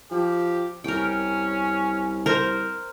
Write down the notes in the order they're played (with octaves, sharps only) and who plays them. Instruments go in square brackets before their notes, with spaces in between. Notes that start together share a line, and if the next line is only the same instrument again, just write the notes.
[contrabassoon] F3 [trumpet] G4
[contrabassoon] C2 [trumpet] C#4 [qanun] A#4 G5
[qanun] A#4 C5 A#5